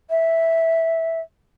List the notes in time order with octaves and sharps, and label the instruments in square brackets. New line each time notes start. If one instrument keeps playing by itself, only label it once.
[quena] E5